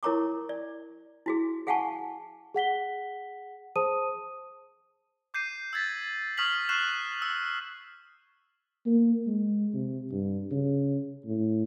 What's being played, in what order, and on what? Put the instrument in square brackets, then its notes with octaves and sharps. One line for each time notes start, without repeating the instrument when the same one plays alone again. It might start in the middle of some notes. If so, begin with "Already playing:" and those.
[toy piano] E4 A#4 C#5 A#5 C#6 D6
D5
E4 F#4 G#4
G#4 F5 F#5 G#5 A5 C#6
[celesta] G#4 F#5 B6 G7
G#4 C5 A5 D#6 D#7
[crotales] D6 G6 C7 D#7
E6 G#6 A6 B6
C#6 D#6 F6 G#6 B6 F#7
C#6 F6 F#6 C7 E7
E6
[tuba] A#3
G#3
C3
G2
C#3
A2